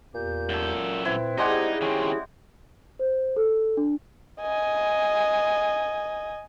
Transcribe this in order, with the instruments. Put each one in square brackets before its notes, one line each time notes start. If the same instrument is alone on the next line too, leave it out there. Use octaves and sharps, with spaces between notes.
[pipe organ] E2 G4 G6 [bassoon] A#2
[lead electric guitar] F#2 A4
[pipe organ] A#2 B4 [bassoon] C4 [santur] E4
[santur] G3 G#3 F#5 [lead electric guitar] D#4 [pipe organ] E4 G4 G#4
[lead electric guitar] D#3 C4 [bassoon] C#4
[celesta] C5
A4
D4
[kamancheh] D#5 G#5